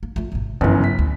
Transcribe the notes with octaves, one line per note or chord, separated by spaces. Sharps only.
A#3
A3 F4
G#1 C3
G1 F#2 C#3 E3 F#3
B6
D2